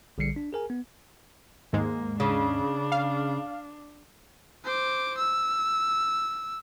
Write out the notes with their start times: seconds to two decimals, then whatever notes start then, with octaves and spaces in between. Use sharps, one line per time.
0.18 A#1 D3 G3 C7 C#7
0.36 D4
0.53 G#4 A#4 G#5
0.70 B3
1.73 D#2 G#2 G#3 A#3
2.20 C#3 D4
2.92 F5
4.65 C5 D6
5.18 E6